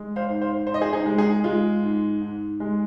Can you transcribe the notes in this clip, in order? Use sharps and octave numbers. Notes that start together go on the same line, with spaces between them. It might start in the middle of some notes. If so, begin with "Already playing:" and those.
Already playing: G#3
C5 F5
G#2
C5 F5
G#2 C5
D#5
G#4 C5
D#4 G#4
G#3
D#4 G#4
G#3 F4
G#2
G#2
G#3